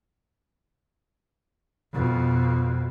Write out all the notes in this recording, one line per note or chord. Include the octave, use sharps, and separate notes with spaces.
F2 B2